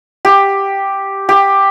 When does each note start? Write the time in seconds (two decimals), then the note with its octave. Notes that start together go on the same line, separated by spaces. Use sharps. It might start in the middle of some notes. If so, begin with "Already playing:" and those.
0.25 G4
1.29 G4